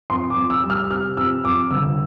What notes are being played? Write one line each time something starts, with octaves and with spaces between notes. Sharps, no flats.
F2 C6
D6
F2
E6
G3
F6
C3 F6
F2 E6
F2 D6
G1 E6